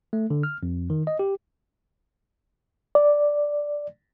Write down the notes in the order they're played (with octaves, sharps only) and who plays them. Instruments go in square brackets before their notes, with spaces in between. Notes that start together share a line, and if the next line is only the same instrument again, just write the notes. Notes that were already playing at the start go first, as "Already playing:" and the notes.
[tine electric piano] A3
D3
F6
F2
D#3
D#5
G4
[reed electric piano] D5